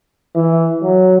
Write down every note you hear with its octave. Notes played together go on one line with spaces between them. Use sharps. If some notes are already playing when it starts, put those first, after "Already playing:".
E3
F#3